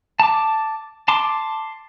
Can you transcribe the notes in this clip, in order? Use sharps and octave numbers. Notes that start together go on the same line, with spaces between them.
A5 D6
A5 C6 D6